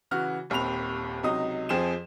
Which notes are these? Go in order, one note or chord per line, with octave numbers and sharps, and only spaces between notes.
C#3 E3 F#4 F6
D#1 D#2 C4 B5 F7
C#2 C3 F#3 D#4 D#6
F2 F3 G#4 C5 G5 E7